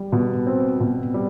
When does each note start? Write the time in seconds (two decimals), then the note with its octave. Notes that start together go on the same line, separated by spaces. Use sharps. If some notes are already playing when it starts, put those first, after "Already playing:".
Already playing: G3
0.12 B2
0.46 C4
0.80 B2
1.14 G3